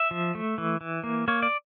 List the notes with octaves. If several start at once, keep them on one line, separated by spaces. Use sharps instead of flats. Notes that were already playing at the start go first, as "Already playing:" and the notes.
Already playing: E5
F3
A3
E3
E3
A#3
A#3 C#5
D5